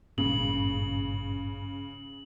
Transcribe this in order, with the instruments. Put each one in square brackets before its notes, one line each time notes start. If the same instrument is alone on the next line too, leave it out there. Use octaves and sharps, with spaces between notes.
[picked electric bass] G#1 G2 A#2 [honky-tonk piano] C#3 [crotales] F#7